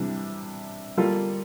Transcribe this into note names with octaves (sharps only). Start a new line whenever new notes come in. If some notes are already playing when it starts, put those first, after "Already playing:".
Already playing: C3 E3 G3 D4
G3 A#3 F4 A4